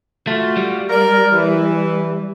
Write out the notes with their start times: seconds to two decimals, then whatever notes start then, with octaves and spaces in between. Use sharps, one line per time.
0.27 A3 F4 F#4
0.57 G3
0.90 A#4 D5
1.33 E3